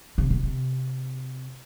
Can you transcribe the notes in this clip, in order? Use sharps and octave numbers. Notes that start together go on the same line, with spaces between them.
C3
B2
C3